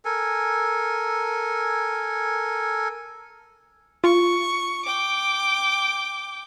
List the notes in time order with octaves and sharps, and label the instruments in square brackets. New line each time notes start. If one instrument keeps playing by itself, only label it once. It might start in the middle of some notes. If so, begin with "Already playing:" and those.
[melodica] A4 A#4 G#5
[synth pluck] F4 [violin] C#6
[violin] G5 D6